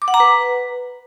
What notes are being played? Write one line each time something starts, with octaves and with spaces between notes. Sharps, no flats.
D6
F#5
A#5
B4